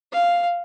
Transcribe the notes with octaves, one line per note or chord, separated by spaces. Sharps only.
F5